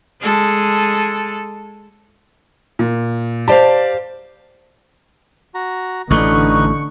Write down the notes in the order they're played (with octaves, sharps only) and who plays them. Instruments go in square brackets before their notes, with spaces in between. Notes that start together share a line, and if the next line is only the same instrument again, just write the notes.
[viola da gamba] G#3 A4
[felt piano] A#2
[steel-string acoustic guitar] G4 C5 F5 [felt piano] D5 A5
[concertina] F#4 A#5
[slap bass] A1 A3 [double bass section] D3 [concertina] D#4 B4 F#6 [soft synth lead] C#6